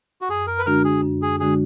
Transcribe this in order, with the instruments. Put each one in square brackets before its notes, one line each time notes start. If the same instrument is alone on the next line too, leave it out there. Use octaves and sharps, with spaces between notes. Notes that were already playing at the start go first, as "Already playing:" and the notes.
[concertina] F#4
[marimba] F#2 [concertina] G#4
[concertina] A#4
B4
[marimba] D3 G#3 D4 F#4 [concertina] A#4
[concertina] G#4
[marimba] F#2
[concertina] G#4
[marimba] D3 G#3 D4 F#4 [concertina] G#4